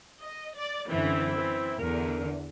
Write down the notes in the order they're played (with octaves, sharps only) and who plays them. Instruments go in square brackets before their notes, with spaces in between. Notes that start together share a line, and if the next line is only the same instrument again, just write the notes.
[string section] D#5
D5
[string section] F#2 D3 E3 [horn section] C4 E4
[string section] E3
[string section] E2 D3 [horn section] A#4